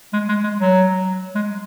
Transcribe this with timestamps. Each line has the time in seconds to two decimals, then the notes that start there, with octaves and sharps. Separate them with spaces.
0.13 G#3
0.29 G#3
0.44 G#3
0.59 F#3
1.35 G#3